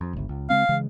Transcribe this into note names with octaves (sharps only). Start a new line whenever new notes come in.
F2
G1 C#2
C#2
C#3 G#3 C4 F5
C#3 E3 G#3